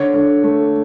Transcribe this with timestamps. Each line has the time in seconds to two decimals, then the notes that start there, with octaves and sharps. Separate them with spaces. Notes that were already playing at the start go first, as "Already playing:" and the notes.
Already playing: D3 C#5
0.14 D3
0.44 A3